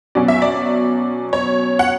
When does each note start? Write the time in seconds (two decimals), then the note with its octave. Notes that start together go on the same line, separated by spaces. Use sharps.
0.15 B2 F#3 C#4 D5
0.28 E5
0.42 D5
1.33 C#5
1.79 F#5